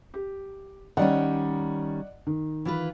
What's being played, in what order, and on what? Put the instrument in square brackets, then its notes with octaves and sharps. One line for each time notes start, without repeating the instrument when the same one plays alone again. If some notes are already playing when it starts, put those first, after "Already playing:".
[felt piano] G4
[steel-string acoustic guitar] D#3 G3 C#4 [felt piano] D5 D#5 F#5
[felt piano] D#3
[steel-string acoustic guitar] E3 F4 B4